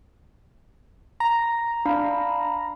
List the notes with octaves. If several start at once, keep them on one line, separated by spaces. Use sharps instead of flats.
A#5
D4 F5 B5